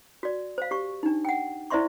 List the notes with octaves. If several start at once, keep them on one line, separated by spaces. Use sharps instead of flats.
F#4 D5
C5 F5
G4 C#6
D4 D#4
F#5 G5
E4 C5 D5 E5 C6 C#6